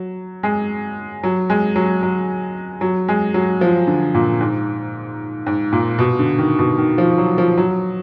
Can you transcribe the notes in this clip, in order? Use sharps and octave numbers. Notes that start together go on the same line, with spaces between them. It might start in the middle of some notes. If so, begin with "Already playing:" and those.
Already playing: F#3
G#3
F#3
G#3
F#3
F#3
F#3
G#3
F#3
F3
D3
A#2
G#2
G#2
A#2
B2
D3
D#3
B2
D#3
F3
F#3
F3
F#3